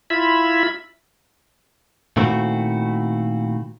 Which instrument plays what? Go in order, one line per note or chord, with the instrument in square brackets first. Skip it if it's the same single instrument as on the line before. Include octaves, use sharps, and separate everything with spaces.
[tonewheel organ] E4 F4 E5 B5
[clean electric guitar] A#2 D#3 A3 C4 E4 F#4